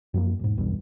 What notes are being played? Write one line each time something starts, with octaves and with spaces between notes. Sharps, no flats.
F#2 F3 A#3
E1 G#2
B1 E2 G2